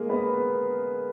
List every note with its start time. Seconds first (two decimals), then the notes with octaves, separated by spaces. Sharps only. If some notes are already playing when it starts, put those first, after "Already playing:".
Already playing: G#3 A#3 G#4 A#4
0.09 B3 B4